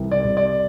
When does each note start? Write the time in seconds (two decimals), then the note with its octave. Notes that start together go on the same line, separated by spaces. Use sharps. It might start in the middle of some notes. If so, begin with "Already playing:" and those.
Already playing: C2 C3 E3
0.11 D5
0.24 C2
0.37 D5